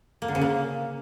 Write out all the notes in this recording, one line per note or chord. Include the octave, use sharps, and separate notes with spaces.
A#3
D3
C#3
A#3